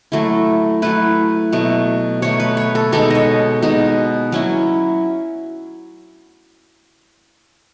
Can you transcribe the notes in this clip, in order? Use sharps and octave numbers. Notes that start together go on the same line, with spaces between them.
F#3 A3 E4
F#3 A3 E4 B4
B2 F#3 A3
B2 F#3 A3 C#5
B4
C#5
A4
B2 G#3 D#4 A4
C#5 D#5
B2 G#3 D#4
F#3 C#4 E4